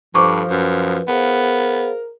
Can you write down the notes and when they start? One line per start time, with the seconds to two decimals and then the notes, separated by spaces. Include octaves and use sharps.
0.15 G2 F3 A4 C5 C#6 D6
0.50 F#2 B4
1.09 B3 G#4 A#4 C5 F5